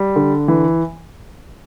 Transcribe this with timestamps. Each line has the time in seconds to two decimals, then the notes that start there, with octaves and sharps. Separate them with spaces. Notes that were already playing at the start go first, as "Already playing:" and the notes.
Already playing: G3
0.16 D3
0.48 E3